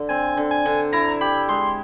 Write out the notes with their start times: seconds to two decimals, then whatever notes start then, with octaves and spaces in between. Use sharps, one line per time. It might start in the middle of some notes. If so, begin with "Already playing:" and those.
Already playing: D3
0.09 C4 G#5
0.37 D3
0.51 G#5
0.66 D3
0.93 E4 A#5
1.21 G4 B5
1.49 G#3 C6